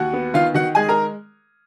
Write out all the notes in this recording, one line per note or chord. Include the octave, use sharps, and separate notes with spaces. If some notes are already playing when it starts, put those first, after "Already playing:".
Already playing: D#2 F#4 F#5
B3
D#3 F4 F5
D#3 F#4 F#5
G#3 G#4 G#5
A#4 A#5